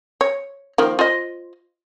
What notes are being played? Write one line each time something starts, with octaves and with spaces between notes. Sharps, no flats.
C#5
D#3 F3 A#3
F4 C5 D#5